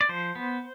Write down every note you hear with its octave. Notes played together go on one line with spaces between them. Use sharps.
D5
F3 C5
B3